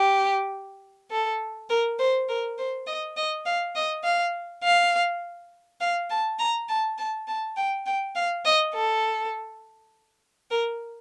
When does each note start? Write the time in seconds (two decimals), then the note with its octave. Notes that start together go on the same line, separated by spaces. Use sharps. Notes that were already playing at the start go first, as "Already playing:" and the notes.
Already playing: G4
1.11 A4
1.70 A#4
1.99 C5
2.28 A#4
2.58 C5
2.87 D#5
3.17 D#5
3.46 F5
3.76 D#5
4.04 F5
4.63 F5
5.81 F5
6.10 A5
6.39 A#5
6.69 A5
6.98 A5
7.28 A5
7.57 G5
7.86 G5
8.16 F5
8.45 D#5
8.74 A4
10.50 A#4